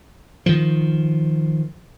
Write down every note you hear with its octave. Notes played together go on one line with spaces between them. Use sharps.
D#3 F3